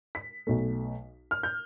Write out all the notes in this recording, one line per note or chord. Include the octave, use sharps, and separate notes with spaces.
B6
B1 B2 A3
F6
G6